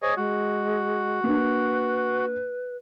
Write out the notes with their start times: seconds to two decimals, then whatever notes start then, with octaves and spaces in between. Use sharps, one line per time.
0.02 G#4 C5 C#5 D#5
0.17 G#3 F#4
1.24 A#3 D4 B4